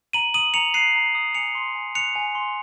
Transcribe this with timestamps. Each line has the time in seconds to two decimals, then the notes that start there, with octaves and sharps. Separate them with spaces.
0.13 A#5 D#7 F#7
0.34 D#6 D#7 F#7
0.54 A#5 C#7 F7
0.74 F#6 C7 D#7
0.95 A#5
1.15 D#6
1.35 G#5 C#7 F7
1.55 C6
1.75 G#5
1.95 F#6 C#7 F7
2.16 G#5
2.35 C6